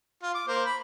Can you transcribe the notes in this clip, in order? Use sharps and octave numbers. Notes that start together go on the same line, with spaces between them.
F4
D6
A#3 C5
B5